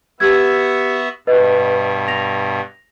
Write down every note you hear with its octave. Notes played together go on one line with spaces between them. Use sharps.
B3 F#4 G4 E5 E6 G#6
G2 B2 B4 D#5
A#6 F7